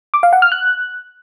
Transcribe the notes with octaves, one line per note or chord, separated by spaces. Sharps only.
D6
F5
F#5
F6
F#6